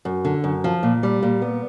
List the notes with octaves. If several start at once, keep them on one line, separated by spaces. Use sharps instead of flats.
F#2
D3
F#2
F3
A#2
G3
A#2
B3